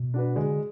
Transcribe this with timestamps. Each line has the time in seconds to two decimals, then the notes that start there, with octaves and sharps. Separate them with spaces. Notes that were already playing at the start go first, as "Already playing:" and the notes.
Already playing: B2
0.14 D4 F#4 B4
0.36 D3 G#3